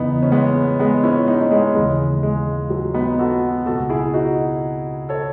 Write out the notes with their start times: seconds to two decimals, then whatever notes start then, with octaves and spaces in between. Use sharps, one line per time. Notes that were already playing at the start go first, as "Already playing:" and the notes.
Already playing: E2 C#3 E3 B3 D#4
0.22 C#4
0.32 G#3 B3
0.80 G#3 B3
1.03 C#4 E4
1.27 B3 D#4
1.41 C#4
1.51 G#3 B3
1.75 D#2 C#3 E3 G#3
2.23 G#3
2.70 F#3
2.94 B3 D#4
3.19 F#4 A4
3.66 B2 F#4 A4
3.71 C#2
3.89 E4 G#4
4.14 D#4 F#4
5.09 A4 C#5